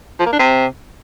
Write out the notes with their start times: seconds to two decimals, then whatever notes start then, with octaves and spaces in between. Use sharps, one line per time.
0.19 F3
0.26 A#3
0.32 D4
0.39 C3